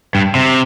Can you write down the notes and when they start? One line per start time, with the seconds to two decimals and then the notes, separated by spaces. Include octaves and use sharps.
0.15 G2
0.35 C3